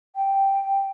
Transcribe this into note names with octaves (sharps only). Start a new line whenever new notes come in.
G5